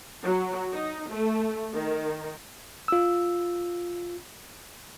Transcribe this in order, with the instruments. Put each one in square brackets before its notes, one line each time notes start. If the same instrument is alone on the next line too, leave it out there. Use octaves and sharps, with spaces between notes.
[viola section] F#3
D#4
A3
D#3
[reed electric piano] F4 E6